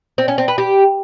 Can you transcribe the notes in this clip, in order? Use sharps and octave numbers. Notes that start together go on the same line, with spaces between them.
C4
C#4
C4
B4
G4